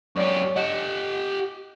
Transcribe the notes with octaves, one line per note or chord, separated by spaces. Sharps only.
F#2 G4 C#5 D5 C#6
G4 D#5 F#5 E7